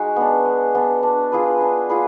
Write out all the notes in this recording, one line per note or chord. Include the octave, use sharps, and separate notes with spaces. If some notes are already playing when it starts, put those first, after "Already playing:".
Already playing: G#3 D#4 F#4
B3 D4
G#3
B3 D4
D4
F4 G#4 B4
D4
F4 G#4 B4